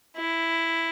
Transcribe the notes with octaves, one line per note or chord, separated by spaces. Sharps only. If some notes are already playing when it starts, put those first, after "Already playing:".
E4